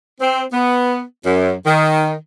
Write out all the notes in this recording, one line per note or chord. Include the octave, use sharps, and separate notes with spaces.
C4
B3
F#2
D#3